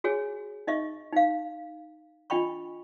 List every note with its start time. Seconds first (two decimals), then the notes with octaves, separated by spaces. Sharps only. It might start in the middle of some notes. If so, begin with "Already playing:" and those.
0.04 F#4 G#4 C#5 G#5
0.67 D#4 D#5 E5 C#6
1.13 D#4 F5
2.30 D4 F4 D#5 G5 B5 C#6